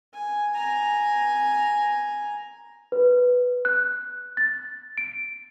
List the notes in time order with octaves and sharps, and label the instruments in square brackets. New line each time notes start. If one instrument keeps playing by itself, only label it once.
[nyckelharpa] G#5
G#5 A#5
[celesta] B4
F#6
A6
D7